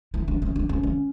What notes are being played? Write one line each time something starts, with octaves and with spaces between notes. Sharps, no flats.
E4
D4
C#4
D4
C#4
C#4